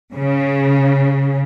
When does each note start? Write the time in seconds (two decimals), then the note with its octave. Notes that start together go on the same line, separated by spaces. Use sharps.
0.16 C#3